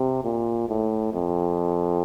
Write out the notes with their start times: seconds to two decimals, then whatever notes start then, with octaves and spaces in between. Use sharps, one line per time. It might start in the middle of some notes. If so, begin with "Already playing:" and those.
Already playing: C3
0.24 A#2
0.69 A2
1.12 F2